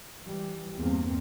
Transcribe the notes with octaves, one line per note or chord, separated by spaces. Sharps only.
E3 G3
E2 G2 A#3 C4